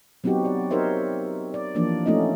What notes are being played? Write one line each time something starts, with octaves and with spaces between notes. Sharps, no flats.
F#3 B3 C4 D#4 F#4 G4
D5
D#4 G4 A#4 C5 C#5 E5
D5
E3 F3 A#3 D4 D5
A3 C4 C#4 D#4 F4 D#5